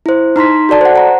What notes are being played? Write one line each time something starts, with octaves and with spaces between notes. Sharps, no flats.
E4 C5
D#4 A#5 C6 B6
F#4 A4 D5 A5
C5 F#5
F#5 A#5